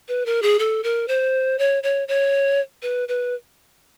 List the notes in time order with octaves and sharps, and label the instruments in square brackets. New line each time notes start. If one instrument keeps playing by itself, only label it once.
[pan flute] B4
A#4
G#4
A4
A#4
C5
C#5
C#5
C#5
B4
B4